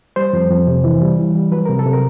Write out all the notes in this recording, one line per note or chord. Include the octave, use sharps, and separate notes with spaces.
G3 C5
F2
F2
C3
E3
G3
E3
G3
F#3 B4
C3 A#4
A4
C3
A#4